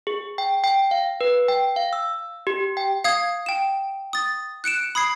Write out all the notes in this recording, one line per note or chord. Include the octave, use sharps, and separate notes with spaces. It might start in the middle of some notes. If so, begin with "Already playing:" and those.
G#4
G5
G5
F5
B4
G5
F5
E6
G4
G5
F5 D#6 G#6
G5 E7
D#6 A6
F#6 C#7 D7 E7
B5 D#6 G#6 C7